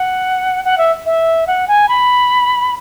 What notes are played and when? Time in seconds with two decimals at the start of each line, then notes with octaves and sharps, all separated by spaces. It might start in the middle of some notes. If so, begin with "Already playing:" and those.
Already playing: F#5
0.65 F#5
0.78 E5
1.06 E5
1.47 F#5
1.68 G#5
1.89 B5